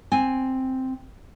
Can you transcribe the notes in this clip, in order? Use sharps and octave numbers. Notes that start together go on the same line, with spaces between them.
C4 G#5